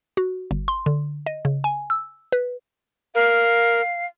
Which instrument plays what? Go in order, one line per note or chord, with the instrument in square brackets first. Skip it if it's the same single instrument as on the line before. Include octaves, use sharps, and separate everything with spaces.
[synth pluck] F#4
G1
C6
D3
D#5
C#3
G#5
E6
B4
[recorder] A#4 [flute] F5